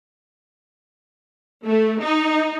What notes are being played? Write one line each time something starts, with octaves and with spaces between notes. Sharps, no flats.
A3
D#4